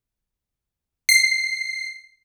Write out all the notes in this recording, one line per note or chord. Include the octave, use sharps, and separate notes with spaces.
C7